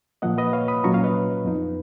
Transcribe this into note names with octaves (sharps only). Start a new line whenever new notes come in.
A#2 F3 A#3 D#5 F#5
B4 D#5
C#5 F5
B5 D#6
A#2 F#3 C#4 F4 A#5 C#6
C#5 F5
B4 D#5
F2 F3 B3 D#4